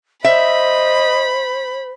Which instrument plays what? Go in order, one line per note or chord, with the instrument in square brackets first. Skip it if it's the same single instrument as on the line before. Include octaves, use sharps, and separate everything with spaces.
[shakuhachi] C5 [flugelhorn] D#5 [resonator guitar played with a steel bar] E5 [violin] B5